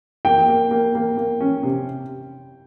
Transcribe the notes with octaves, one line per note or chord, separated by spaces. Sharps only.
A#3 G5
A#3
A#3
A#3
A#3
C#4
C3